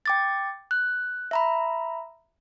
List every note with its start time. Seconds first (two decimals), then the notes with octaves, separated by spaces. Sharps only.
0.06 G5 D6 A6
0.71 F#6
1.31 E5 A#5 B5